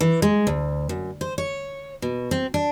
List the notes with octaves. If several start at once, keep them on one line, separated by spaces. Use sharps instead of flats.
E3
G#3
D2
F#2
C5
C#5
B2
C4
D4